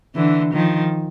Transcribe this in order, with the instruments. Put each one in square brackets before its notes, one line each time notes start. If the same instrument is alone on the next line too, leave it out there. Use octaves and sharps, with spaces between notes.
[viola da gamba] D3 E3
D#3 F3